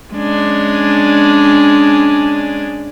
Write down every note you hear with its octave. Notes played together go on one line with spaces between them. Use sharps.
G#3 C#4 D4